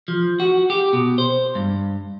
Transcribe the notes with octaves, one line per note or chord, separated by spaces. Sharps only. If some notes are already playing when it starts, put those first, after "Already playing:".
F3
F#4
G4
B2
C5
G2